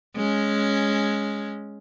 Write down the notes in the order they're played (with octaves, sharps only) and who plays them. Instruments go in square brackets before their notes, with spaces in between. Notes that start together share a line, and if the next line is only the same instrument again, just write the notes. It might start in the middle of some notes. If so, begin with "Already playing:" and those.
[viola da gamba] G#3 C#4